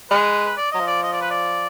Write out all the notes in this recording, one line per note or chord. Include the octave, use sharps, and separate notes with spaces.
G#3 B4
B4
D5
F#3 D#5
F3
D5
D#5
D5
B4
D5